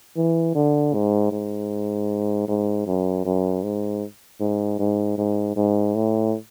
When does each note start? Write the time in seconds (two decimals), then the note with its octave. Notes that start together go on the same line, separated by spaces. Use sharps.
0.17 E3
0.55 D3
0.94 G#2
1.32 G#2
2.48 G#2
2.87 F#2
3.25 F#2
3.63 G#2
4.40 G#2
4.79 G#2
5.18 G#2
5.56 G#2
5.95 A2